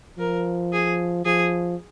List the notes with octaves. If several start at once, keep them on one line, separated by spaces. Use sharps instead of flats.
F3 A#4
G#4
F3 G#4